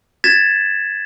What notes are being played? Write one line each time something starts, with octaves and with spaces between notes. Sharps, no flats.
G#6 A6 B6 E7